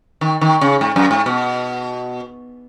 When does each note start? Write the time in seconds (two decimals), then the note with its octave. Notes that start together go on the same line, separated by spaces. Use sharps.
0.21 D#3
0.41 D#3
0.61 C#3
0.81 G#2
0.96 F#2
1.11 G#2
1.26 B2